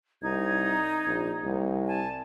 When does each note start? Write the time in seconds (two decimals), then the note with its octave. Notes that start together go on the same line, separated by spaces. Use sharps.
0.22 C2 D#4 G#6
1.06 A#1
1.44 C2
1.86 G#5 A5